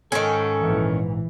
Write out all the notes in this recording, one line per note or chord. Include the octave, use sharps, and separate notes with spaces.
G#2 D#3 C#4 A4 G#5
A#1 E3